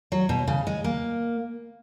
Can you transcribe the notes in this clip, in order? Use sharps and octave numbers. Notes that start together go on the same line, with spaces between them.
F#3
B2
C#3
G#3
A#3